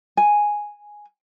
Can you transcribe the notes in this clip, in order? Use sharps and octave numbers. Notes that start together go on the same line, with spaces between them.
G#5